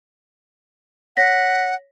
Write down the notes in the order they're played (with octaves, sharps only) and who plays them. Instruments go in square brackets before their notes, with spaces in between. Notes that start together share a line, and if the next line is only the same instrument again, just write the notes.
[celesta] C#5 A#6 B6 [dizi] F#5